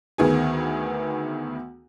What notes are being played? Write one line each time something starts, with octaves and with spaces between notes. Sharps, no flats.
D2 D#3 B3 G#4